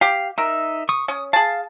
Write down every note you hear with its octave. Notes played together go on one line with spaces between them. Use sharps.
G4 F5
D#4 A#4 E5
C#6 D#6
C#4 D#6
G#4 F5 A5